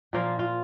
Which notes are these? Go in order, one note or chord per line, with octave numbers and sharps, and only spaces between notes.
A#2 F3 A#3 F4
F4